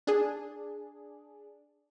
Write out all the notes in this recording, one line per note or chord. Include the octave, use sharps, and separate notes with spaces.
D4 G#4